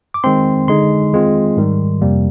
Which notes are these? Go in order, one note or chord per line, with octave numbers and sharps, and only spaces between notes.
D6
D#3 G#3 C4 C6
D3 G#3 D#4 C6
D#3 G#3 C4 F4
G#2 D#3 G3
F2 C3 G3 A#3